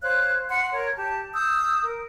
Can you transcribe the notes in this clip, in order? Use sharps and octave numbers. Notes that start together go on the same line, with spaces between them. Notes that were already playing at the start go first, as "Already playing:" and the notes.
C5 C#5 F5 F#6
F#5 C6
A#4 C#5
G4 A5
D#6 E6 G6
A#4